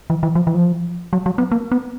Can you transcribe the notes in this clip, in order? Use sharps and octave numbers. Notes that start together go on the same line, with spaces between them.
E3
E3
F3
E3
F3
F#3
F#3
B3
A#3
B3